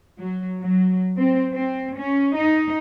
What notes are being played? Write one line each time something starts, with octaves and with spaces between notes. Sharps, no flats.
F#3
F#3
C4
C4
C#4
D#4